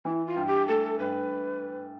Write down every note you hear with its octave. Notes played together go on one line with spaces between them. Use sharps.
E3 E4
F4
G2
G4
A3 A4
G2 B4